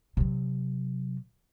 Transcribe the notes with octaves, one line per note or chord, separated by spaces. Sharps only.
C3 F#3